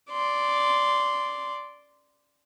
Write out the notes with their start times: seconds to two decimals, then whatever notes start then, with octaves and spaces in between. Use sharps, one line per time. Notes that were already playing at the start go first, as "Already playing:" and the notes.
0.11 D5 C6